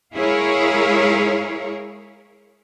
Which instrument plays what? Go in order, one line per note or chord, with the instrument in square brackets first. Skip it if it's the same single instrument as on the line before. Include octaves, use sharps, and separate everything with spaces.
[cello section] G#3 E4 G#4 A#4 C#5 F5